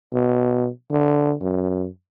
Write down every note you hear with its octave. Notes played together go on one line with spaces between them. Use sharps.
B2
D3
F#2